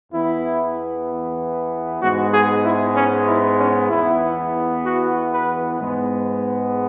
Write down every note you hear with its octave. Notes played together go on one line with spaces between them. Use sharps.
E2 E3 B3 E4
G#2 G#3 B3 F#4
G#4
E4
C#4
E4
C#4
E2 E3 B3 E4
F#4
B4
G#2 G#3 B3